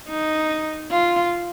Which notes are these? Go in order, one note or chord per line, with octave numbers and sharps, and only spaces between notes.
D#4
F4